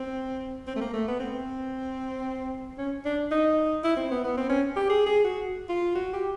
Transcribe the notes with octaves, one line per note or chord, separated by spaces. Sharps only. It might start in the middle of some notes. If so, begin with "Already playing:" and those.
Already playing: C4
C4
A3
A#3
A3
B3
C4
C#4
D4
D#4
E4
C4
B3
B3
C4
C#4
G4
G#4
G#4
F#4
F4
F#4
G4